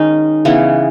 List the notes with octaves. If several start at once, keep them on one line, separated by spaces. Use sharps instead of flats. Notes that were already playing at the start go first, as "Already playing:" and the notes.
Already playing: D#3 G#3 C#4 D#4
C#3 E3 B3